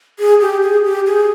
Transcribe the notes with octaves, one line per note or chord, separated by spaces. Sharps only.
G#4
G4
G#4
G4
G#4